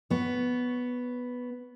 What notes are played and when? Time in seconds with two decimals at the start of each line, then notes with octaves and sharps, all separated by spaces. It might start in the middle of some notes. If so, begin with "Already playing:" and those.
0.10 B3 C#5